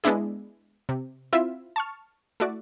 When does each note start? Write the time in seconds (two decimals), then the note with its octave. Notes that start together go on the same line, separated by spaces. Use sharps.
0.04 G#3 B3 D4 E4 G#4
0.89 C3
1.33 C4 E4 F4 E5
1.76 A5 C#6 F6
2.40 A3 E4 F#4 D5